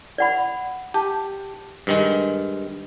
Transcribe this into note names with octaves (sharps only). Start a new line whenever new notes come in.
D5 F#5 B5
G4 A5
G2 D#3 G#3